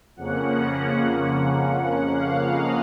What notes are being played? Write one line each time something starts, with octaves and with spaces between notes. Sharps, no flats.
F2 C#3 F3 A#3 C#4 F#5
F#5
F5
D#5